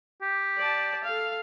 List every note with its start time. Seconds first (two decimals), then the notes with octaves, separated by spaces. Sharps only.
0.22 G4
0.58 D5 A5
1.04 A4 F5